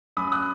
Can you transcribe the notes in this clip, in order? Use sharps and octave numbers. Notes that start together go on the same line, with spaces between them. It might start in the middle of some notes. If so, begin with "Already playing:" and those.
F#2 B5 D#6
D#6 F#6